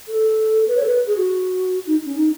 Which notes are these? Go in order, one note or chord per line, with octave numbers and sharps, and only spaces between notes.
A4
B4
C#5
A4
B4
G#4
F#4
D#4
C#4
D#4